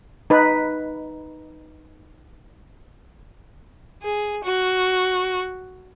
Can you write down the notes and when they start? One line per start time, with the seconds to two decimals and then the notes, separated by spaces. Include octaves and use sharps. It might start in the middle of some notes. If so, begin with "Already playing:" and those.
0.30 D#4 B4
4.02 G#4
4.44 F#4